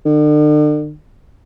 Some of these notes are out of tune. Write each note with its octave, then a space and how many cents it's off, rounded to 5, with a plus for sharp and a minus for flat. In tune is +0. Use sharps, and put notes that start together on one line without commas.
D3 +40